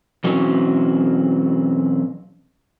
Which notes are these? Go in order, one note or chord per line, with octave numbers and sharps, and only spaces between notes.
B2 E3 F#3 C4 C#4